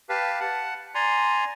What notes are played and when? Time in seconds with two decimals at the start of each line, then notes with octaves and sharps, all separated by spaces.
0.09 G4 B4 F5 A5
0.40 F#5 A5
0.95 D5 G#5 A#5 C6